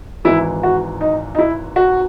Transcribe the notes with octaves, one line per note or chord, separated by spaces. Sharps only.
G#1 G#2 E3 E4
F#4
D#4
D#4
E4
F#4